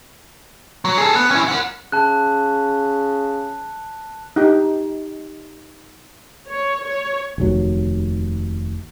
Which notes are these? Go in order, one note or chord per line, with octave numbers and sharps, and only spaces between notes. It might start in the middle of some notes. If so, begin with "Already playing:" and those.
F#3
G#4 A4
B3
C#4 E4
A#4 F#5
C#3 A5 F#6
D#4 G4
C#5
C#5
F1 D#2 F#3